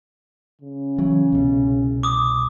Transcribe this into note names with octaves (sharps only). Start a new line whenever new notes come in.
C#3
E3 F#3
C2 B2
D6 D#6